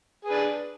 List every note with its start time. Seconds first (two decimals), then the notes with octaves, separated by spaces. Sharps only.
0.24 G#4
0.28 B4
0.32 D4